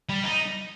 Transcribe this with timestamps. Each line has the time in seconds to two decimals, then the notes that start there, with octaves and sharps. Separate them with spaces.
0.09 G3
0.24 D#4